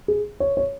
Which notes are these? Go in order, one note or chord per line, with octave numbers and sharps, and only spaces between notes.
G#4
C#5
C#5